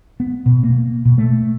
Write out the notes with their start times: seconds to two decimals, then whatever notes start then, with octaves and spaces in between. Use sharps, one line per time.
0.20 B3
0.46 B2
0.63 A#3
1.05 B2
1.18 A3